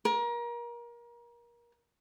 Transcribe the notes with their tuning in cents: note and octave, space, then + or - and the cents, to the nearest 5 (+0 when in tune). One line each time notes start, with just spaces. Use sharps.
A#4 +30